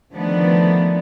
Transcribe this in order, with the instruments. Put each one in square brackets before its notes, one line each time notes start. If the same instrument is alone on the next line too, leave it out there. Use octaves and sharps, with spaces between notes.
[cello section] D3 D#3 F3 A3 B3 D4